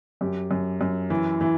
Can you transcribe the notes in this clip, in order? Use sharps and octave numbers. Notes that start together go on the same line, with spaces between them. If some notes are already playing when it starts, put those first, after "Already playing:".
F#2 G4
F#2
F#2
E3
E3